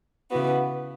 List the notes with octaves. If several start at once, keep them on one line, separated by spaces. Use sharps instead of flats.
C#3 E3 B3 F#4